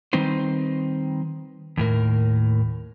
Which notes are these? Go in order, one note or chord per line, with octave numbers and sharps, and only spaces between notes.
D#3 G3 C4 D#4 B4 C5
D#2 A2 A#4